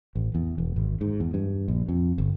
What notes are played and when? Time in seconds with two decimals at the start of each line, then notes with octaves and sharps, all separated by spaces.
0.15 A1
0.35 E2
0.58 E1
0.76 G#1
1.01 G#2
1.20 E2
1.34 G2
1.68 A#1
1.88 F2
2.18 G1